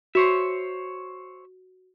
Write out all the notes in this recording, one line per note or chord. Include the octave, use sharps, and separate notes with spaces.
F#4 C5 C#5 E5